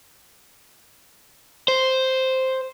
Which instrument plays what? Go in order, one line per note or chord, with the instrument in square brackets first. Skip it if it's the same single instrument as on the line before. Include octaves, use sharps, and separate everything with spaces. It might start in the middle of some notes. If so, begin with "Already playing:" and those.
[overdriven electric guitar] C5